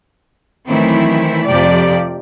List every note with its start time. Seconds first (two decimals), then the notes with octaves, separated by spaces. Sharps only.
0.68 D#3 E3 F#3 A3 C4 E4
1.46 F2 C3 F3 G4 D5